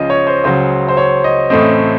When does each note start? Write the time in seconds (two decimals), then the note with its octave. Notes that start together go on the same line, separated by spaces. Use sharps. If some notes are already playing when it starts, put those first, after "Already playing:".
Already playing: C#2 C#3 F3 D#5
0.10 C#5
0.27 C5
0.44 C#2 C#3 F#3 C5
0.88 C5
0.97 C#5
1.24 D#5
1.50 A1 A2 A3 C4 D#5